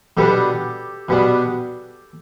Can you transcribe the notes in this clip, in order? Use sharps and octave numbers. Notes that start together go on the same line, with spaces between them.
B2 G3 B3 D4 G4 A4
B2 G3 B3 D4